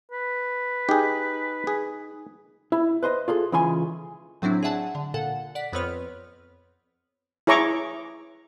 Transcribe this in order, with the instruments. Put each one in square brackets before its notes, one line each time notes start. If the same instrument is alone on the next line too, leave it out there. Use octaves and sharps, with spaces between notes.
[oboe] B4
[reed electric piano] D#4 [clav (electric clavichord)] G4 G#4
[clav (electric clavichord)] G#4
[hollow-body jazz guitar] E4
B4 C5 D#5
F4 G#4 A4
C#2 C#3 E3 F4 G#5 C6
[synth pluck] A2 F#3 C4 D4 E4
G#4 D5 E5 F#5 A5
D3
A#2 A4 F#5
D5 F#5 B6
F2 B3 C4 B4 C#5 F6
[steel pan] E4 G#4 C#5 A#5 C#6 D6